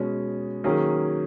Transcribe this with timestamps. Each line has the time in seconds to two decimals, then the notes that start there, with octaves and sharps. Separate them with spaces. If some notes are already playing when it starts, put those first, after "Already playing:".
Already playing: B2 G#3 C#4
0.64 D#3 F#3 A#3 C#4 G#4